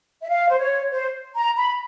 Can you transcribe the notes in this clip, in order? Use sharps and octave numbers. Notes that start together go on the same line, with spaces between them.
E5
F5
C5
C#5
C5
A#5
B5